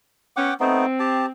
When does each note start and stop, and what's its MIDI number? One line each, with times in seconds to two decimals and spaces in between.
0.36 0.51 59
0.36 0.51 61
0.36 0.54 78
0.36 0.54 79
0.36 0.54 86
0.60 0.86 57
0.60 0.86 59
0.60 1.32 60
0.60 0.86 63
1.00 1.26 67
1.00 1.26 81